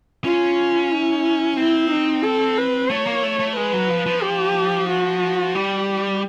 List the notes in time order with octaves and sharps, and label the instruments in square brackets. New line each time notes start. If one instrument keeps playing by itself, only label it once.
[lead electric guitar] C#4 [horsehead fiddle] F4
[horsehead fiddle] E4
[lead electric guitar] C4 [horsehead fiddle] E4
[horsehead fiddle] D#4
A4
B4
[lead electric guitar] A3 [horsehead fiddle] C#5
[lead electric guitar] A#3
A3
A3
[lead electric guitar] G#3 [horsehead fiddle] B4
[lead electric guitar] F#3
F3
F3
[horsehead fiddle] G4
F#4
[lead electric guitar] G3 [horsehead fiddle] G4